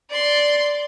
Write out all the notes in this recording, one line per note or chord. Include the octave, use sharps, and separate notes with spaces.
D5 C6